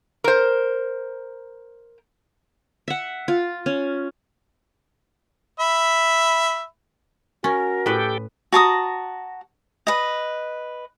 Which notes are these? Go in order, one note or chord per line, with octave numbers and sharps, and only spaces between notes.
A#4 C5
E5 F#5
F4
C#4
E5 B5
C#4 F#4 A#4
A2 G4 A4 B4 G5
F#4 A5 A#5 D#6
B4 D#5